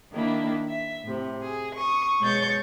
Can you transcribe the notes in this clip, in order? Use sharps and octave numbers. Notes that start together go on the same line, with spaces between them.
D#3 A#3 D4 E4
E5
A2 C3
G#4
C#6 D#6
B2 G#3 C#5 C#6 G6 A6